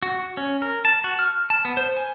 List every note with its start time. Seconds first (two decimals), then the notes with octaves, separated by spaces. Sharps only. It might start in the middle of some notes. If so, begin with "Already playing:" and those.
0.03 F#4
0.37 C#4
0.62 A#4
0.85 A5
1.04 F#4
1.19 F6
1.50 A5
1.65 B3
1.77 C5
1.97 G#5